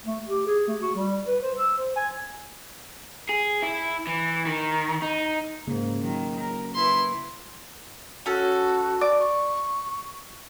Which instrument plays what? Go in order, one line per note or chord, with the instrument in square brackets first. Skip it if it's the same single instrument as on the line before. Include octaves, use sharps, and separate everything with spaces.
[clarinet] A3
G4
G#4
A3
F#4
G3
B4
C5
E6
C5
G#5
[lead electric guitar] G#4
E4
E3
D#3
D#4
[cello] G#2 [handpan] C#3 A#3
[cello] D#3 [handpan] F#3
[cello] A#4
[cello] E4 B4 [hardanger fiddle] C6
[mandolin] C#4 A4 [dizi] F#4
[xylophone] D5 [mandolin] D6
[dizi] C#6